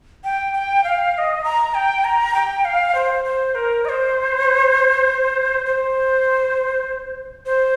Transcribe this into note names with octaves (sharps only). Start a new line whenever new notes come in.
G5
G5
F5
F5
D#5
A#5
G5
A#5
G5
F5
C5
C5
A#4
D#5
C5
C5
C5